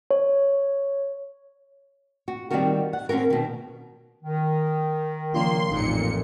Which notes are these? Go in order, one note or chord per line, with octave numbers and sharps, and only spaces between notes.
C#5
F#4
D#3 G3 C4 F4 F#4 A#4
F#5
C4 C#4 F4 F#4 A#4
B2 D#3
D#3
C#3 F3 A#3 D4 F4 C6
A1 F2 A#2 D#4 C#7